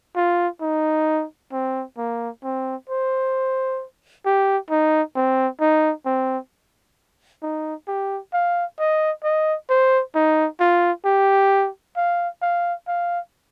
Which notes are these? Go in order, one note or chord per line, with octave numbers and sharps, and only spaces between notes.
F4
D#4
C4
A#3
C4
C5
G4
D#4
C4
D#4
C4
D#4
G4
F5
D#5
D#5
C5
D#4
F4
G4
F5
F5
F5